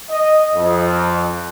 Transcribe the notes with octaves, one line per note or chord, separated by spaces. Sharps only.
D#5
F2